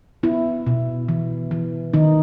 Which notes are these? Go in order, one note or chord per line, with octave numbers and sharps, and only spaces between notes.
B3 E4
B2
E3
E3
D#3 D#4